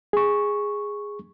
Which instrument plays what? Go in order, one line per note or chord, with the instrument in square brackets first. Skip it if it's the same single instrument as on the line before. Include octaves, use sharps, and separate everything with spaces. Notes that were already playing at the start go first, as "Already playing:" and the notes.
[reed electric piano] G#4 C#6